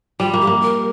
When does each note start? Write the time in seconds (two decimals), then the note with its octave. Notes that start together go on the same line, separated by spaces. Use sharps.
0.20 G3 F4
0.33 A#3
0.41 G4
0.47 A#3
0.61 A#4